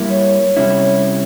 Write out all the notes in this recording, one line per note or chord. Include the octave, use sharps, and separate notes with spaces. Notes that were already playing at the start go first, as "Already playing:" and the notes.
Already playing: G3 A#3 E4
C#5
C3 G3 C#4 E4